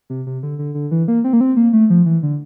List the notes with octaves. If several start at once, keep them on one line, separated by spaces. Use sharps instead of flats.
C3
C3
D3
D3
D3
E3
A#3
C4
A#3
C4
A#3
A3
F3
E3
D3